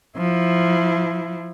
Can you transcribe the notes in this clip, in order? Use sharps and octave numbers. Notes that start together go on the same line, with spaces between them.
F3 E4